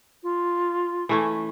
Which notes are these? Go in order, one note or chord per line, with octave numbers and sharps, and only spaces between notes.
F4
E3 A3 C#4